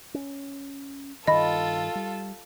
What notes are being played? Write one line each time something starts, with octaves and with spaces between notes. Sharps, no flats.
C#4
G2 D#3 F4 A4 D#5 B5
G3